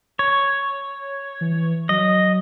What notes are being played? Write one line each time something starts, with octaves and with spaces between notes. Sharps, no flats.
C#5
E3
F#3 D#5